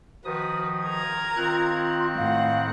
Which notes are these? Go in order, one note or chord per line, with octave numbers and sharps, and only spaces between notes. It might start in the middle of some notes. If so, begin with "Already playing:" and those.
D#3 F3 F#4 B4 D#6
A#4 A#5 G#6
D#3 C4 F4 F#6
A2 F5 F#5